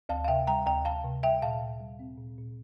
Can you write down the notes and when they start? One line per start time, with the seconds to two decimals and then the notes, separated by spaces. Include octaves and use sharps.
0.09 D2 F5 A5
0.24 F5
0.28 C3 E5 G5
0.47 G3 G5 A#5
0.66 D2 G5 A#5
0.85 D2 F5 A5
1.04 C3
1.23 G3 E5 G5
1.42 A#2 F5 A5
1.61 A#2
1.80 G3
1.99 C4
2.18 A#2
2.38 A#2